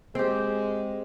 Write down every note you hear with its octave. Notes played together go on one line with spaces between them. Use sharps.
G#3 C4 G4